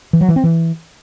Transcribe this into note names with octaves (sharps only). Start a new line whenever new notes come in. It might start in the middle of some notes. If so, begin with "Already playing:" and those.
E3
F#3
E3
C4
E3